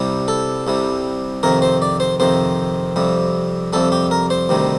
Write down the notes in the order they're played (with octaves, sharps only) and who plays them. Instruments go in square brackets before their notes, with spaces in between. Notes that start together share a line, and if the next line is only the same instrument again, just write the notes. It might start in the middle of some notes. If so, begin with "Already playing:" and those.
Already playing: [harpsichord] C2 C3 G3
A4
C2 C3 G3
F2 C3 D#3 A#4
C5
D5
C5
F2 C3 D#3 C5
F2 C3 G3
F2 C3 G3 A4
G4
A#4
C5
D2 C3 D#3 G3